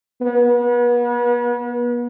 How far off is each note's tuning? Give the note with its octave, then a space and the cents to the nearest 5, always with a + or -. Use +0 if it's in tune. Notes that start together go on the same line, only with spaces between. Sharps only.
B3 -35